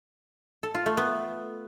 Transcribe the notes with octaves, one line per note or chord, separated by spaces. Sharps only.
A4
F4
A3
B3